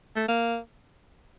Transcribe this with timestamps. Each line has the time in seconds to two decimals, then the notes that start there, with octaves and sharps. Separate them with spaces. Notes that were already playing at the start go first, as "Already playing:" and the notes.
0.16 A3
0.28 A#3